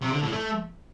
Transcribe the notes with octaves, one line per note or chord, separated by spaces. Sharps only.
C3
D3
A2
A3